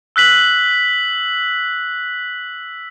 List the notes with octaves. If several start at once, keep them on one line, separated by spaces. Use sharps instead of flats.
E6 F#6 B6 F#7